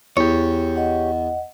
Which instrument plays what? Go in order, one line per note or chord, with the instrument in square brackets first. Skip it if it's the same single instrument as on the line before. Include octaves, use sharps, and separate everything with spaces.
[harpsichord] E2 [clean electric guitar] G4 C#5
[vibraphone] D#5 F#5